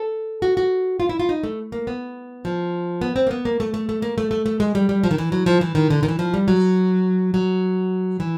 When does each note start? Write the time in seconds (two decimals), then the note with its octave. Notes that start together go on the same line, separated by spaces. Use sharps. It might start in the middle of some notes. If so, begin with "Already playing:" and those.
Already playing: A4
0.42 F#4
0.57 F#4
1.00 F4
1.09 E4
1.20 F4
1.29 D#4
1.43 A3
1.72 A#3
1.87 B3
2.45 F3
3.01 B3
3.16 C4
3.27 A#3
3.31 B3
3.45 A#3
3.60 A3
3.74 A3
3.89 A3
4.02 A#3
4.18 A3
4.31 A3
4.46 A3
4.60 G#3
4.75 G3
4.89 G3
5.04 F3
5.11 D#3
5.18 E3
5.32 F#3
5.46 F3
5.61 E3
5.75 D#3
5.90 D3
6.03 D#3
6.08 E3
6.19 F3
6.34 G3
6.48 F#3
7.34 F#3
8.20 E3